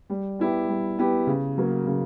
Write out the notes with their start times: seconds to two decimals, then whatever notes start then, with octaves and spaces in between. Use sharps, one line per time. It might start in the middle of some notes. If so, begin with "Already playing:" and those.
0.10 G3
0.39 B3 E4 G4
0.69 G3
0.98 B3 E4 G4
1.27 C#3
1.58 F#3 A#3
1.86 C#3